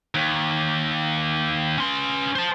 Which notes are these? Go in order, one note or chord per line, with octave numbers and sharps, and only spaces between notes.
D#2
C#4 C6
C5 A5